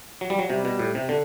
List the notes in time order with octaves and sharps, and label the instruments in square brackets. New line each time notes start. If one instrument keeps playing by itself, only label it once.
[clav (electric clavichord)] F#3
G3
F#3
[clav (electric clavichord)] C3 [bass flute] G3
[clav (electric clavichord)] B2
A2
C3
D3